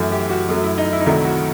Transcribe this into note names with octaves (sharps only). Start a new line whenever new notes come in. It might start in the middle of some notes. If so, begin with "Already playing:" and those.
Already playing: F#2 E3 A3 F#4
G4
F#4
F#2 F#3 A3
E4
D#4
E4
D#4
C2 C3 D#3 F#3 A3 E4
F#4